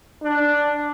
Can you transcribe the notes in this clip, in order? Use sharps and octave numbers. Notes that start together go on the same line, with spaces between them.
D4